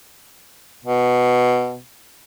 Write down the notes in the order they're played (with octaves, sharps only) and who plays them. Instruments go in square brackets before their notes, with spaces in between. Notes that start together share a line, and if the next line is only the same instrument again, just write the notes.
[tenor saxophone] B2